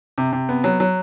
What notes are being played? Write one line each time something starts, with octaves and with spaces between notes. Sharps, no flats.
C3
C3
B3
F#3
F#3